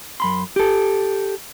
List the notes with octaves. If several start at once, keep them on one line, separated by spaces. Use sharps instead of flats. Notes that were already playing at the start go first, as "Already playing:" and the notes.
F#2 B5 C6
G4 A4